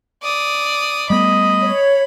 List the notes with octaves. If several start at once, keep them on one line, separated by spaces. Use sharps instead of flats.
D5 D#6
G3 A3 B3 D#5 B5
C#5